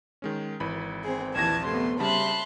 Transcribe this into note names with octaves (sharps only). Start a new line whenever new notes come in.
D#3 G#3 C#4
G#1 E3 B5
C4 G#4
A#1 D#2 E3 A5 G#6 A#6 E7
C3 A3 B3 C6
C#3 G3 C#4 E5 A5 B5 C6 F#6